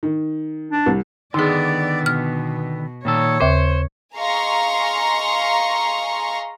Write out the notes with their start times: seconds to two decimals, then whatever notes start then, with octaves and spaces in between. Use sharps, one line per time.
0.03 D#3
0.72 D4
0.86 C2
1.34 D3 D#3 B3 D#4 G#4 D5
2.06 B2 F6
3.05 A#2 D#3 A4 C#5
3.41 D#2 C#3 C5
4.16 G#4 D#5 F5 A#5 C6 C#6